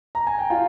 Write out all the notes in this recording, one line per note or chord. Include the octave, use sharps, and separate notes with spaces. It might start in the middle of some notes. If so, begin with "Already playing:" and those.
A#5
G#5
G5
F4 F5